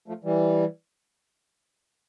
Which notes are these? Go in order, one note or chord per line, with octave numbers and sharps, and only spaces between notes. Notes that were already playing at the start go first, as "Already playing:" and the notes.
F3 A3
E3 G3